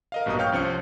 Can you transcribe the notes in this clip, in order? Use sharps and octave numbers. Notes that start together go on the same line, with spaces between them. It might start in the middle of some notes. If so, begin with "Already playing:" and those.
A#4 D#5 F5
A#1 G2 B2 A#5 D#6
C#5 F5 G5 C#6 F6 G6
C2 F3 C#4 C#7